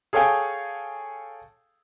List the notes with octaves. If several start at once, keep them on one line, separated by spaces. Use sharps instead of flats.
G#4 A4 C#5 F5 G5 G#5